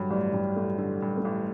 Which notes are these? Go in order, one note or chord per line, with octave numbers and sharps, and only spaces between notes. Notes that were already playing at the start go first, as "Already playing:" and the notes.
Already playing: G2 D3 F#3
A1 G3
G2 G3
A1 A3
D3
G2
A3
A1